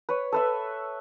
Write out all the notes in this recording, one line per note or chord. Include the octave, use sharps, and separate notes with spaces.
B4 C#5
A4 B4 E5